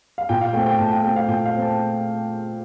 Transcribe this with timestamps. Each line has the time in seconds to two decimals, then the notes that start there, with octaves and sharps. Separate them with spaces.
0.18 F5
0.29 A#2 G5
0.41 F5
0.53 A3 G5
0.57 C4
0.66 G5
0.79 A#2 A5
0.92 G5
1.04 A3 C4 G5
1.16 F5
1.28 A#2 G5
1.45 F5
1.54 A3 C4
1.62 A5